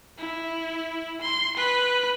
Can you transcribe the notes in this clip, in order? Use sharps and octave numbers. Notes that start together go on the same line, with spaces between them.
E4
C6
B4